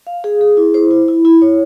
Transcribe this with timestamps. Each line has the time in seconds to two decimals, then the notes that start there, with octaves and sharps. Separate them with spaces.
0.07 F5
0.24 G#4
0.41 G#4
0.57 E4
0.74 C5
0.91 E4
1.08 E4
1.25 E4
1.42 C#5